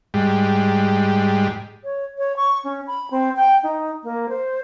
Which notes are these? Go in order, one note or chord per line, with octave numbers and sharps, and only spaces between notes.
G#2 G3
C#5
C#5
C#6
C#4
B5
C4
G5
D#4
A#3
C5